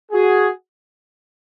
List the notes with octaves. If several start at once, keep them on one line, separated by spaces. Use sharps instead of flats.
F#4 G#4